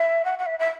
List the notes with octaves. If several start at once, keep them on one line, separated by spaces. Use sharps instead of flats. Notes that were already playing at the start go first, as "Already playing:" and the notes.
Already playing: E5
F#5
F#5
E5
E5